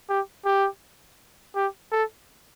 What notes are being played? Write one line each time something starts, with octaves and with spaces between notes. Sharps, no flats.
G4
G4
G4
A4